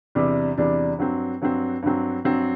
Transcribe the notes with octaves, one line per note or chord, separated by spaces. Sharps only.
E2 C3 G3 D4
E2 C3 G3 D4
G2 F#3 C4
G2 F#3 C4
G2 F#3 C4
G2 F#3 C4